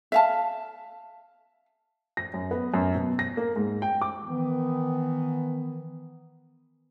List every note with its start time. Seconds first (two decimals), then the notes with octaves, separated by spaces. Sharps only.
0.12 E5 F5 A5
2.17 A#6
2.34 F#2
2.51 B3
2.74 F#2
2.95 B2
3.19 A#6
3.37 A#3
3.56 G#2
3.82 G5
4.02 D6
4.24 D#3 E3 B3